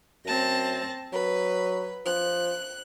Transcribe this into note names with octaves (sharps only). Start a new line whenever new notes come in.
F#2 C4 A5 A#6
F#3 B4
F3 F#6